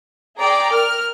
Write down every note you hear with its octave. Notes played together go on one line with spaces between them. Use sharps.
G#4 D5 G5 A#5
A#4 F6